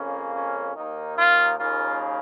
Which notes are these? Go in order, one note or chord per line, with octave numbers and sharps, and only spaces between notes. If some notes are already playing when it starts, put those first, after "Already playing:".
Already playing: F2 C#3 A#3 C#4
C#4
D#2 D#3 A#3 D#4
F4
D#2 C#3 A#3 F4